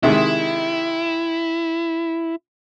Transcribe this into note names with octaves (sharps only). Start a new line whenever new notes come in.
C3 D#3 G#3 E4